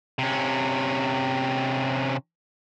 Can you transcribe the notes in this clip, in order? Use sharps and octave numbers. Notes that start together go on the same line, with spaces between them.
C3 C#4